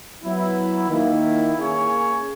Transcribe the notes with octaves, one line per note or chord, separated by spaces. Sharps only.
F#3 B3 E4
D#3 A#3 E4
A#3 C#4 G#4 C#5